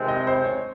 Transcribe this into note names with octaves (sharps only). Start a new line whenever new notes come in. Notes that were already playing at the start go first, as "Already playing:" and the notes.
Already playing: C3 D#3 G#3 C4
D#5
C5
C#5